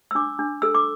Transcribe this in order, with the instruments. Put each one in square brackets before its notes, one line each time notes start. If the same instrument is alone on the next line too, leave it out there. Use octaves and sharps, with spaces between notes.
[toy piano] E6
D4 D6
D4
A4 E6
D6